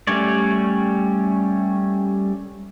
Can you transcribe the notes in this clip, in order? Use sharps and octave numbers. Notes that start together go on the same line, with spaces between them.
G3 A3 C#4 C#5 D5